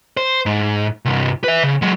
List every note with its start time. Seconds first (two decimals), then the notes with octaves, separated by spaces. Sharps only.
0.17 C5
0.46 G#2
1.05 C2 G2
1.44 B4 E5
1.63 C#3
1.82 F#3 G#3